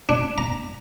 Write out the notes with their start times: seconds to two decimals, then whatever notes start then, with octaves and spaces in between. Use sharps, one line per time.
0.09 D4
0.38 A#5